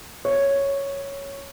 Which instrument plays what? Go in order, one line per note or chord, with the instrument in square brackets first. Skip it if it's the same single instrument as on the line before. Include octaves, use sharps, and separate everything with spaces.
[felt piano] C#5